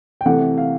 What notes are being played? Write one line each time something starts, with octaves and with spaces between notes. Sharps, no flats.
G5
C3 E3 A3 F#5
F5